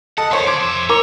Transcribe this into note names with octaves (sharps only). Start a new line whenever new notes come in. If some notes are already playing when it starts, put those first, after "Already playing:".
A4 D#5 F#5 A5
E2 B3 C5 C#5 C6
D3 D5 C6 D6 G#6
F2 E5
A#4 C#5 A#5 D6